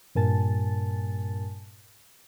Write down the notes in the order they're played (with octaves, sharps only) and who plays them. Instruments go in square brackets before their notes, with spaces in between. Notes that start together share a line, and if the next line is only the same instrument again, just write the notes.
[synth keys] G2 A#2 A#4 G#5 A5 A6